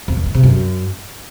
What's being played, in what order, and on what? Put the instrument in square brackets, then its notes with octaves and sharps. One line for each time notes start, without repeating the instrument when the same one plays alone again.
[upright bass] F2
E2
D#3
C3
F#2